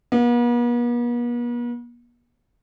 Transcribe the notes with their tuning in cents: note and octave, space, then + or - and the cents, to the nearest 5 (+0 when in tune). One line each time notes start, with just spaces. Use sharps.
B3 -45